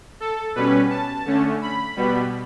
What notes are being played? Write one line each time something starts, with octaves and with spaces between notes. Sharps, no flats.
A4
B2 G3 C#4 B4
A5
D3 A3 C#4
B5
B2 G3 B3